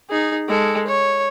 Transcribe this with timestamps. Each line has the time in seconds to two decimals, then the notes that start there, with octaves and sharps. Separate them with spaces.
0.10 D#4 G#4
0.48 G#3 A4
0.87 C#5